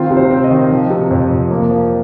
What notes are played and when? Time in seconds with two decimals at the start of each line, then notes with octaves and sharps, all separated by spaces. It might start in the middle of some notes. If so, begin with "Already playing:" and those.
Already playing: D#3 C4 F4
0.10 C3
0.17 C5
0.31 C4
0.44 D#5
0.51 D#3
0.71 F3
0.90 C3
1.11 F2
1.31 F2
1.51 A#3
1.70 F3